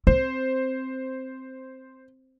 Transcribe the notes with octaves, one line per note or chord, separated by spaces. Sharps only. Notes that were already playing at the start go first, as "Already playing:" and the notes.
C4 C5